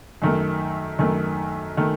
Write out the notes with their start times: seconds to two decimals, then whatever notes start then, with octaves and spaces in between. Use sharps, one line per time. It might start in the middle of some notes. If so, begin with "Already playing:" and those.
0.22 F#2 D#3 A3
0.99 F#2 D#3 A3
1.77 D#3 A3